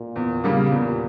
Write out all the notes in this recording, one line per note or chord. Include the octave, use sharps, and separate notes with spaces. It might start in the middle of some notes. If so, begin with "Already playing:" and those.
Already playing: A#2
E2
C#3 G3 A#3
E2 A#2